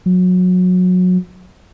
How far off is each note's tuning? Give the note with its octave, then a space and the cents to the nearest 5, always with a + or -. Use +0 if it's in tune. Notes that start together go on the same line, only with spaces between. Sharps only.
F#3 -25